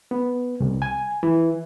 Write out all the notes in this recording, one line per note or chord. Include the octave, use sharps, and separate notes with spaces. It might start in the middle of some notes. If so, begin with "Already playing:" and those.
B3
C2
G#5
E3